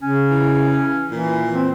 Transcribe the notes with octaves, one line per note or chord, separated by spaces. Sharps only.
C#3 C#4
E3
A#2 E3
C4